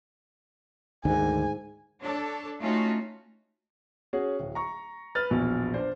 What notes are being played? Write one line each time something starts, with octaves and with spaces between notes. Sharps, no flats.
D2 G#2 D3 D#3 G#5
D4 A4 C#5
A3 C#4 D#4 F4 F#4
C#4 F#4 G#4
D1
A#5 C#6
B4 F6 A6
A#1 E2 B2
D4 C5